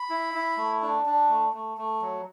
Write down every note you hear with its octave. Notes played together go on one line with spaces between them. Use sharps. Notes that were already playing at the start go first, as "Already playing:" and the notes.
Already playing: B5
E4
E4
A3
D4
D4
A3
A3
A3
F#3